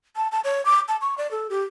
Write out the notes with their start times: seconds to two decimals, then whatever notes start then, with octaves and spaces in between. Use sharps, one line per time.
0.16 A5
0.32 A5
0.44 C#5
0.66 D6
0.88 A5
1.02 C#6
1.18 D5
1.31 A4
1.50 G4